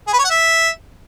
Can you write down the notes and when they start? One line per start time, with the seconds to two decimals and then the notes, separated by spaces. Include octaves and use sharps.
0.08 G#4
0.13 B4
0.19 C#5
0.25 F#5
0.30 E5